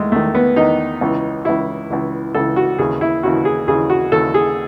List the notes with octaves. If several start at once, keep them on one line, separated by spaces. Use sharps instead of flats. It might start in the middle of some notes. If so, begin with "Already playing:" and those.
Already playing: E2 D#3 G#3 A3
E2 D#3 A3
B3
E2 D#3 D#4
C#2 C#3 E3
C#2 C#3 E3 E4
C#2 C#3 E3
C#2 C#3 E3 A4
F#4
D#2 C#3 E3 G#4
E4
D#2 C#3 E3 F#4
G#4
D#2 C#3 E3 G#4
F#4
D#2 C#3 E3 A4
G#4